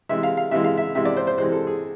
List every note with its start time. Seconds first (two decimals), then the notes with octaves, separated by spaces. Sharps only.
0.09 C3 E3 G#3 E5
0.23 F5
0.37 F5
0.51 C3 E3 G#3 E5
0.64 F5
0.77 E5
0.95 C3 E3 G#3 E5
1.05 D5
1.17 C5
1.27 C5
1.38 C3 E3 G#3 C5
1.52 A4
1.67 G#4